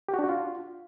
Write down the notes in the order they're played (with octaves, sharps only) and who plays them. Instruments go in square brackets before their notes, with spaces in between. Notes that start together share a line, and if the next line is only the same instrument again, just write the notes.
[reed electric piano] G4
F#4
D4
F#4
F4